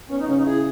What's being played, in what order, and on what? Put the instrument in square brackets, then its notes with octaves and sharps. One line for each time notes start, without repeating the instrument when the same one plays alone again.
[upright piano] B3 [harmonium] C#4
[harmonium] D#4
[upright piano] C#3 [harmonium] C#4
[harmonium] D#4
[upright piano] E4 [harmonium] G#4